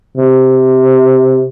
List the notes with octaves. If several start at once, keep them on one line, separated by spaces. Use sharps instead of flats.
C3